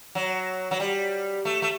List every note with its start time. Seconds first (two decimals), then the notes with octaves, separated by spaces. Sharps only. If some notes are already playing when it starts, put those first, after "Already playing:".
0.15 F#3
0.71 F#3
0.80 G3
1.45 A3
1.62 A3